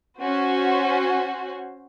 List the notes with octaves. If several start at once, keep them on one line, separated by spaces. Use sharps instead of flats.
C#4 F#4 C5